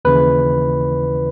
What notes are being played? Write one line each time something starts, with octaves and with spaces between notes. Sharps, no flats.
D#2 C#3 E3 B4